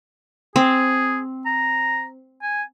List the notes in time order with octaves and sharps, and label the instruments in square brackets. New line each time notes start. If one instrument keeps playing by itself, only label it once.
[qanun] C4 [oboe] G#4
[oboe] A#5
G#5